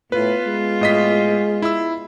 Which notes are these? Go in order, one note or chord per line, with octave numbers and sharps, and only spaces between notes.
A2 B3 F4 B4
G#3
A2 D#5 B6
E4 E6